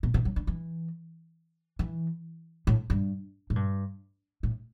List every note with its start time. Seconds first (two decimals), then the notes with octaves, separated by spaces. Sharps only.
0.03 B2
0.14 C3
0.25 F#3
0.36 D3
0.47 E3
1.79 E3
2.67 A2
2.90 G2
3.50 A2
3.56 G2
4.43 A2